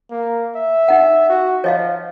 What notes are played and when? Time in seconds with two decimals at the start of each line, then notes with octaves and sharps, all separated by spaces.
0.11 A#3
0.55 E5
0.88 D#4 F#5
1.30 F#4
1.64 F3 C#5 D#5 F5